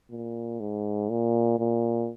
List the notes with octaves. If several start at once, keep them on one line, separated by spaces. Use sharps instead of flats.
A#2
G#2
A#2
A#2